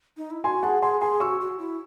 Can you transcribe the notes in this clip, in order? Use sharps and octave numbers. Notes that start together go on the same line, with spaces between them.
D#4
E4
F#4 G#5 C6
G#4 F#5 A5
G#4 G#5 C6
G#4 G#5 C6
F#4 C#6 E6
F#4
E4